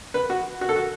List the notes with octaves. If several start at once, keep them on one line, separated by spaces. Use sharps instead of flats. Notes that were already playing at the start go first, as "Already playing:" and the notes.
B4
F#4
F#4
A4
F#4